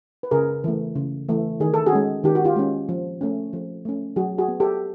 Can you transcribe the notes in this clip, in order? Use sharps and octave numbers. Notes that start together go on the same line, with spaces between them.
B4
C#3 G#4 A#4
E3 A3
C#3
E3 A3
D#3 G#4
A4
F#4 G#4
G#3 C#4
D#3 G4
F#4
F4 G4
G#3 C#4
F3
A3 C#4
F3
A3 C#4
F#3 F#4 G#4
F#4 G#4
B3
G4 A4